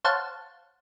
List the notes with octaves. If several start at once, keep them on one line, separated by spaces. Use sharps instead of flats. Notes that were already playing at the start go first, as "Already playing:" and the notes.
C5 C#5 F5 F#5 A5